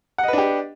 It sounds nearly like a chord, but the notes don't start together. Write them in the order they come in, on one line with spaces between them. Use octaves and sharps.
F#5 D#5 B4 D4 G4